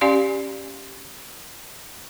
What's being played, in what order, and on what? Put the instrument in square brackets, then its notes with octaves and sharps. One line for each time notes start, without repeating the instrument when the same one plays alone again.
[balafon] C#4 G4 D5 F5 G#5 C6